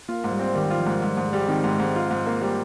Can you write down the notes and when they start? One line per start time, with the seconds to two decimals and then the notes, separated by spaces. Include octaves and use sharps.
0.08 A#3 F4
0.24 G#2
0.32 G3
0.39 C4
0.55 D#3 G3
0.70 F4
0.78 F3
0.86 G#2
1.02 G#2 G3
1.17 G#2
1.25 G#3
1.33 G3
1.48 D#3 C4
1.64 G#2
1.72 G#3
1.80 G#2
1.96 F4
2.11 G#2
2.26 A#3
2.42 G3